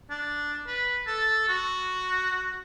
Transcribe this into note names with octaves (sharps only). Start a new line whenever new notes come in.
D4
B4
A4
F#4